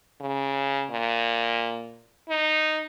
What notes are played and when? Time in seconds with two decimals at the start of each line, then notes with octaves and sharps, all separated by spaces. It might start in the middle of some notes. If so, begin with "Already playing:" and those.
0.21 C#3
0.90 A#2
2.29 D#4